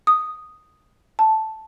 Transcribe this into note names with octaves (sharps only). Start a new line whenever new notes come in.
D#6
A5